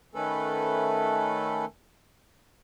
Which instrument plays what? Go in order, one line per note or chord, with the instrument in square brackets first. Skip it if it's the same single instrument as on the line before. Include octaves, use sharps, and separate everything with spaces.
[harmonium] D#3 A3 C#4 A4 B4